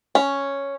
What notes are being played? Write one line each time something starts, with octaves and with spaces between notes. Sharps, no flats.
C#4